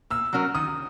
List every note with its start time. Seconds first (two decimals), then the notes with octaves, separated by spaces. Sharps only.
0.10 A#2 E6
0.33 F#3 C#4 F#4 A#4
0.55 D#3 D#6